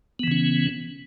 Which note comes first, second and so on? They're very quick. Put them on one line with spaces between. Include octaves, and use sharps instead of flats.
B3 E3 C#3 C#4